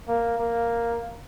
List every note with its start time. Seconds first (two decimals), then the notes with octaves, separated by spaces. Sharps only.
0.08 A#3
0.38 A#3